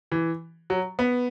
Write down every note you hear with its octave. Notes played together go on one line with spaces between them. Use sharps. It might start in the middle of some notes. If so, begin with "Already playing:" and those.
E3
F#3
B3